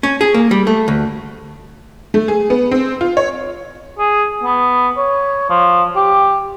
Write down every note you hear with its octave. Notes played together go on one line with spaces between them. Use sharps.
C#4
G#4
A#3
G3
A3
D2
A3
G#4
B3
C4
F4
C#5
G#4
B3
C#5
F3
G4